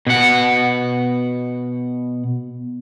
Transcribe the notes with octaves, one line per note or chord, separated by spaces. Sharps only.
B2 F#5